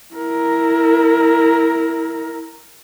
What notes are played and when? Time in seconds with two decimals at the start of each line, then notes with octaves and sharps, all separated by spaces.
0.14 E4 A#4